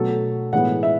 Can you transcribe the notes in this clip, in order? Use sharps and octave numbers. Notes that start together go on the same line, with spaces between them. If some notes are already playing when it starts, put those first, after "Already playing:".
Already playing: B2 F#3 A3 A4
A2 E3 G#3 B3 F#5
E5